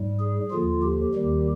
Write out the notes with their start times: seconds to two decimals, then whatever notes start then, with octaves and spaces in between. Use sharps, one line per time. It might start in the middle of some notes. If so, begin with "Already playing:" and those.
Already playing: G#2 G3
0.19 G#4
0.50 D#2 D3 F3 F4
0.82 G4
1.14 D#2 D#3 G3